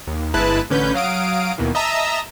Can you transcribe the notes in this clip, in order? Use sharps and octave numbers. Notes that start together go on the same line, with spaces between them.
D#2
G1 G#3 E4 B4 A5 F#6
A1 D3 C#4 B4 G6
F#3 F5 D#6 D7
D#2 B2 D#3 E3
D#5 E5 A5 A#5 D#6 E6